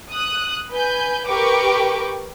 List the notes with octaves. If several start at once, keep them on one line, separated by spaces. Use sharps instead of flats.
D#6 F#6
B4 G#5 G6
G4 A#4 B4 G5 C#6 D6